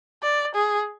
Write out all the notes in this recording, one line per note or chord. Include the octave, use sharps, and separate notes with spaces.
D5
G#4